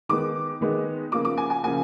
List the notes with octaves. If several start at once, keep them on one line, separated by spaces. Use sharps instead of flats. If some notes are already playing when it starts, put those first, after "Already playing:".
D#3 G#3 B3 D#4 D6
D#3 G#3 B3 D#4
C#3 F3 A#3 D6
D6
G#5
G#5
C#3 F3 A#3 G#5